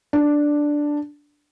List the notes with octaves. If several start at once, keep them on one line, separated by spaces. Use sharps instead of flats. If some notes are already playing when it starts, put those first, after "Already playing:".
D4